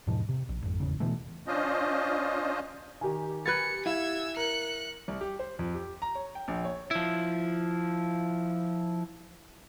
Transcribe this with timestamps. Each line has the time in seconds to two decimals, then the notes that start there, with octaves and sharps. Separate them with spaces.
0.07 E2 G#2 B2 F3
0.29 C3
0.49 A#1
0.63 G#1 F2
0.80 D1 G#1 E2 C#3
1.00 B2 E3 A3
1.47 C#4 D4 F4 C5 D#5
3.01 D#3 G4 G#5
3.46 A#4 B4 F#6 G#6 A6 C#7
3.86 E4 F5 E6 G#6
4.37 A#4 F#6 C#7
5.08 C2
5.21 G4
5.39 C5
5.59 F2
5.75 G4
6.02 A#5
6.15 C#5
6.35 G5
6.48 A#1
6.65 C#5
6.91 F3 E4